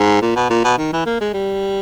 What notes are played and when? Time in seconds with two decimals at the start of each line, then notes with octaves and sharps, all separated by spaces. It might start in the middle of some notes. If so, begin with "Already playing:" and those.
Already playing: G#2
0.22 A#2
0.36 B2
0.50 A#2
0.65 B2
0.78 D#3
0.93 E3
1.06 A#3
1.21 G#3
1.34 G3